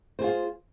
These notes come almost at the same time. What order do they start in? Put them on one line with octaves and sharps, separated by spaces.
C5 G#4 F4